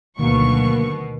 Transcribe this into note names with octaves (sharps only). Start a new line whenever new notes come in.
D2 B2 D#3 F#3 A#3 C#6